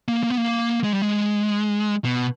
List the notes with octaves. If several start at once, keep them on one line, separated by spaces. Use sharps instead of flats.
A#3
A#3
B3
A#3
G#3
G3
G#3
B2